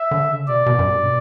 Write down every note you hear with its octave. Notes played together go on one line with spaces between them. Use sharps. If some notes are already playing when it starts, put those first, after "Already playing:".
Already playing: E5
D3
C#3
B2 D5
B2
F#2
G2
B2